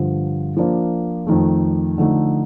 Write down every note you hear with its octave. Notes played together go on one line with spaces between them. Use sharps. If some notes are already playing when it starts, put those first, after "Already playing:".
Already playing: G2 D3 F3
F3 A#3 D4
F2 D#3 A3
D3 F3 A3 D#4